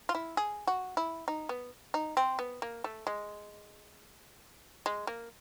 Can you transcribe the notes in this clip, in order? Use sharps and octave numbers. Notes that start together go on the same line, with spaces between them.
F4
E4
G#4
F#4
E4
D#4
B3
D#4
C4
B3
A#3
A3
G#3
G#3
A#3